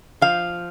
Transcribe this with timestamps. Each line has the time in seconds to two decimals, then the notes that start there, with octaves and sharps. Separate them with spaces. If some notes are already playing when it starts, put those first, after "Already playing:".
0.21 F3 F5